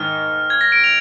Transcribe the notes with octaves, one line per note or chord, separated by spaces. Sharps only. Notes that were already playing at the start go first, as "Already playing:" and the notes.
Already playing: G#2 D#3 D#4 F6
G#6
A#6
D7
F7